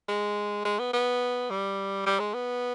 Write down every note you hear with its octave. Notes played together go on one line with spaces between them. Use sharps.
G#3
G#3
B3
B3
G3
G3
G#3
B3